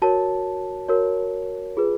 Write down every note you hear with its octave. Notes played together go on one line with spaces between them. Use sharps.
F#4 A#4 C#5 A5
F#4 A#4 C#5
F4 G#4 B4